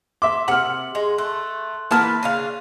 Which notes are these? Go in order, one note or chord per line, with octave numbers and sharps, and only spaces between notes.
E5 C6 D6
C3 F#5 F6 F#7
G#3
A3 C6 F#6
E3 A#3 B3 B4 A5 F6
C#3 D4 F5 D#7